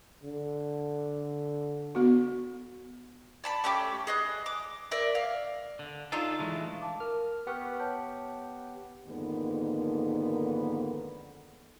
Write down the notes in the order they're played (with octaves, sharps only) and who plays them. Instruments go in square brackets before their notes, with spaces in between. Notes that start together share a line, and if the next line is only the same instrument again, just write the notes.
[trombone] D3
[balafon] B3 F#4
[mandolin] D5 A5 B5
A3 C#4 G4 D6
G#4 D#5 F#6
D6
A#4 D5 E5
F5
[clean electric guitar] D3
[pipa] D4 D#4 F4 [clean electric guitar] A4
[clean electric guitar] E3 G#3 A3
[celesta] F5 A5 D6
[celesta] A#4 [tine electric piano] F6
[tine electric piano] B3 G4 F#5 [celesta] B4 C#6 F6
[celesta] C#5 A5 G6
[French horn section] F2 G#2 D3 D#3 A#3 B3